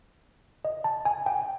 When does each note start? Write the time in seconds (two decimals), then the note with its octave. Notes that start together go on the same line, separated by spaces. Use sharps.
0.65 D#5
0.84 A5
1.05 G#5
1.26 G5